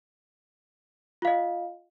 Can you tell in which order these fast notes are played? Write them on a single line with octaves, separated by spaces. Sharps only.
F4 F5 D#5